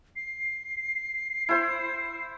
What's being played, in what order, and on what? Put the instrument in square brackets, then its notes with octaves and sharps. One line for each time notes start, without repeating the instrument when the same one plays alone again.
[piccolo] C7
[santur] E4 C5